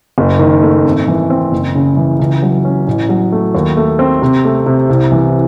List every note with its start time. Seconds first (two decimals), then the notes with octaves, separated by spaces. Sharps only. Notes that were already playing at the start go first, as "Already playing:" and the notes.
0.18 F#1
0.39 D#3
0.63 A3
0.85 G#1
1.07 E3
1.30 C4
1.52 F#1
1.75 C#3
1.97 E3
2.19 C#2
2.42 F#3
2.65 C#4
2.87 A1
3.09 F#3
3.32 A3
3.55 D#2
3.77 A3
3.99 C4
4.22 C3
4.45 A3
4.66 C3
4.90 C2
5.12 E3